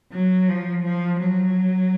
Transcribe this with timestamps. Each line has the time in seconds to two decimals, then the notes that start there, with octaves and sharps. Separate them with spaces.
0.12 F#3
0.49 F3
0.85 F3
1.22 F#3